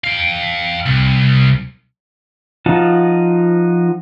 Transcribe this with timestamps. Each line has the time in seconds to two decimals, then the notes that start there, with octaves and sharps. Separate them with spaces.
0.04 F5 G5
0.86 C2
2.66 F3 D#4 F4 F#4 A5